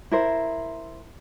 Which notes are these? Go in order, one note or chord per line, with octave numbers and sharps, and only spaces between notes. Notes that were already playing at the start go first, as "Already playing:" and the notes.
E4 A#4 C5